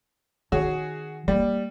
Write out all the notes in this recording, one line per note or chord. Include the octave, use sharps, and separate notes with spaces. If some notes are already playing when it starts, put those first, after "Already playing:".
D#3 F#4 G#4 C#5
G3 A#3